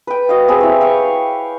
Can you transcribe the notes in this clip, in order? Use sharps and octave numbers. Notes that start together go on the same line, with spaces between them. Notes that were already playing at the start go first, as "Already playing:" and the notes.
B4 G5
F#4 D#5 F5
C4 G4 G#4 B4
E4 C#5
F5 G5 C#6